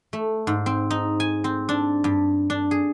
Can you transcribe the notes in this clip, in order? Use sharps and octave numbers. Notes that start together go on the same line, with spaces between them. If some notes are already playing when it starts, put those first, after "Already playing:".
A3
G#2
C4
D#4
G#5
C4
D4
G2
D4
G#4